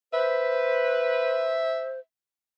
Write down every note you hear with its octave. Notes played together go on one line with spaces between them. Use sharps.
B4 C5 E5